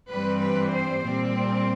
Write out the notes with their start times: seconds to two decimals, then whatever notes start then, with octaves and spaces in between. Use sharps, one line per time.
0.10 G2 E3 G3 C4 B4
0.42 B4
0.73 C5
1.05 A#2 G3 C4